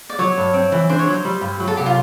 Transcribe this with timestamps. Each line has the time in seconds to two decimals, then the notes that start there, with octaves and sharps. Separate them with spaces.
0.10 D5
0.19 F#3 C#5
0.37 G2
0.54 C4
0.72 E3
0.89 D4 C5
0.99 C#5
1.07 F#3 C5
1.25 G3
1.41 G2
1.60 F#3
1.68 A4
1.77 C2 G4
1.86 F4